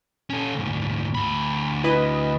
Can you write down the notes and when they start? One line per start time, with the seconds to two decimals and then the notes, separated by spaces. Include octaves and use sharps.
0.30 C#4 A4
0.55 D2 G#2
1.15 D2 B5
1.84 E4 B4 D#5